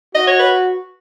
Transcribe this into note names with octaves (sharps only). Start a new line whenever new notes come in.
F#4 D#5
C#5
B4